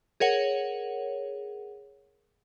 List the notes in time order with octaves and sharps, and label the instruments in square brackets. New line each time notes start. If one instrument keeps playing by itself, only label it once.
[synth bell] G#4 A#4 C#5 F#5